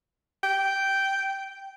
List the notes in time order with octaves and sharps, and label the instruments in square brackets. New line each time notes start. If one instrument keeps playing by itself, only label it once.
[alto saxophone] G5